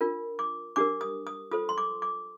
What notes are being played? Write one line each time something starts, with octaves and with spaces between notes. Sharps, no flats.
D4 F4 A#4
D6
D4 G4 A#4 D6
D#6
D#6
F4 A4 C5 D#6
C6
D6
D6